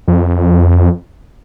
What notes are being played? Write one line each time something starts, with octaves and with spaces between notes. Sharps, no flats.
F2